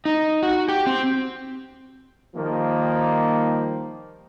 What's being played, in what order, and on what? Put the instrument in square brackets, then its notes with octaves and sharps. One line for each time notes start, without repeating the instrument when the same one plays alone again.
[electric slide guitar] D#4
F#4
G4
C4
[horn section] D#3 F3 G3 A#3